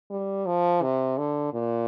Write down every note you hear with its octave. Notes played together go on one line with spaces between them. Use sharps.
G3
F3
C3
D3
A#2